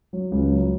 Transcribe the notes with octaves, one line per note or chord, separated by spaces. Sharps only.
F#3
C#2
F#3